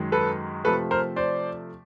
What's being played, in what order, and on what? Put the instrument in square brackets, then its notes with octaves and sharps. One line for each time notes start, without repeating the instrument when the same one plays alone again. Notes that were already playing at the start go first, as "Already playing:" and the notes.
Already playing: [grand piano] F#2 D#3 G#3
A4 B4
C3 F3 A3 A4 B4
A#4 C5
C5 D5